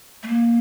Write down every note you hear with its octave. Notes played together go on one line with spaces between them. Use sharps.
A3
A#3